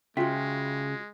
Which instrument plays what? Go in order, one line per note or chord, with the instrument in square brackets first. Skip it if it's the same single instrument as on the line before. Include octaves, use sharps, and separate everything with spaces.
[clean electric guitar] C#3 [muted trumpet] G#3 [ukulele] F4 F#4 [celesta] E5 G5 B6